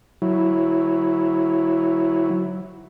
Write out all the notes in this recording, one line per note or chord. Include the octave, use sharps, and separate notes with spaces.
F#3 E4